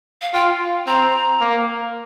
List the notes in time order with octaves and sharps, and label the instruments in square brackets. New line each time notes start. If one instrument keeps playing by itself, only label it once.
[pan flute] F5
[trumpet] F4 [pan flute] G5
[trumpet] C4 [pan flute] A#5
[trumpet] A#3